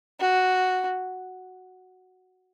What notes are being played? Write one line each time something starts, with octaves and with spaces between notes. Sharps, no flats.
F#4